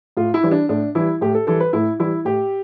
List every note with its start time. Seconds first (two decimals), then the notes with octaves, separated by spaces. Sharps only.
0.17 A2 F4
0.34 E4
0.43 E3 G3
0.51 D4
0.69 A2 D4
0.95 E3 G3 E4
1.21 A2 G4
1.34 A4
1.47 E3 G3 A4
1.60 B4
1.73 A2 E4
1.99 E3 G3 E4
2.25 A2 G4